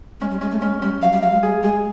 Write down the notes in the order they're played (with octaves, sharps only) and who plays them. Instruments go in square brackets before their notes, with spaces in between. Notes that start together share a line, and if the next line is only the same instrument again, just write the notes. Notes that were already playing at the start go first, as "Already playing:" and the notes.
[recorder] G#3 [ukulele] C#4
[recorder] G3
[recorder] G#3 [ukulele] C#4
[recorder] A3
[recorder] G#3 [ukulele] C#4
[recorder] G3 [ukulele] C#4
[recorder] F#3 [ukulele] F5
[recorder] G3
[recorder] F#3 [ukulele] F5
[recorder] G#3
[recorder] G3 [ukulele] G#4
[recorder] G#3 [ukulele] G#4